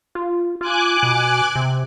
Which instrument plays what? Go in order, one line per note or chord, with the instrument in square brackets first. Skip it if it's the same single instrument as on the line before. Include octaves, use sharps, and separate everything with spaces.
[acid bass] F4
[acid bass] F4 [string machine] G#5 D6 F#6
[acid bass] B2
C3